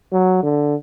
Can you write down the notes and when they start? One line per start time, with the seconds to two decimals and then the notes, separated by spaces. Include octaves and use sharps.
0.12 F#3
0.43 D3